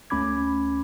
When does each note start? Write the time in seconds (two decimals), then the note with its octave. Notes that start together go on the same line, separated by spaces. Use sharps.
0.10 D2 A3 C#4 B5 D6 G#6